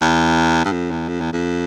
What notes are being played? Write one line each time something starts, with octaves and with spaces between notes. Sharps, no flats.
E2
G2
F2
E2
F2
E2
F2